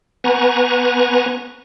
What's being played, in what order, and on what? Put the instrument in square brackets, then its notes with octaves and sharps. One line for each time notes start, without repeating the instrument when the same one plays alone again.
[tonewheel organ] B3 B4 G#5 A#5 C#6